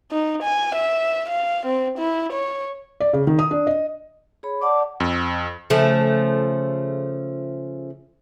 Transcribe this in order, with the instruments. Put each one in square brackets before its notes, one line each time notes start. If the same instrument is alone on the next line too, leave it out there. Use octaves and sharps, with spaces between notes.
[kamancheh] D#4
G#5
E5
F5
C4
E4
C#5
[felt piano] D5
C#3
D#3
D#6
D4
D#5
[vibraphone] G#4 C#5 B5
[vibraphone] D5 F#5 A5 [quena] D6
[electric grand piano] F2
[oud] C#3 F3 A3